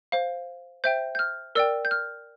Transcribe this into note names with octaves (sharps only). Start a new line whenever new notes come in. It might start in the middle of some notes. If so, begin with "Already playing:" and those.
C5 F5
C5 E5 G5 G6
G6
F6
A#4 D5 G5 E6
G6
F6